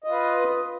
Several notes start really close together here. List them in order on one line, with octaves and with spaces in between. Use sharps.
D#5 F4 B4